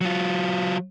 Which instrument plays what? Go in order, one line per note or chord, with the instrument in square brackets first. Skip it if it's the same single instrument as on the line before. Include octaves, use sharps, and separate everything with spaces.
[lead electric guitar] F#3 F4